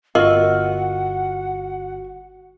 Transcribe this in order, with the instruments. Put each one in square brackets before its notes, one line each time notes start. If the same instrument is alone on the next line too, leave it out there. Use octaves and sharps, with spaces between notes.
[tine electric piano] G1 F#4 [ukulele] F4 [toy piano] A#4 D#5 [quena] F#5